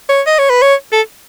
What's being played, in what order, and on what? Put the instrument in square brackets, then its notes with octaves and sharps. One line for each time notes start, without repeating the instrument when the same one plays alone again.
[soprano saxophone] C#5
D#5
C#5
B4
C#5
A4